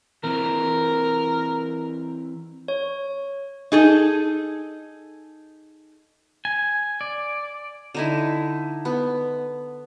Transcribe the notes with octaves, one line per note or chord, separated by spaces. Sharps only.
E3 C4 A#4
C#5
D#4 G#4 A4
G#5
D5
D3 D#4 E4
B3